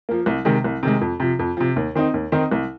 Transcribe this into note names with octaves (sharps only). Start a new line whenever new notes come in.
F3 A#3
C2
C3 D#3 G#3
C2
C3 D#3 G#3
F2
C3 F3
F2
C3 F3
D#2
D#3 C4 D#4
D#2
D#3 C4 D#4
C2